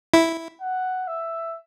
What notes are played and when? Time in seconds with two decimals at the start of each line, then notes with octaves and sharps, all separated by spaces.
0.14 E4
0.61 F#5
1.07 E5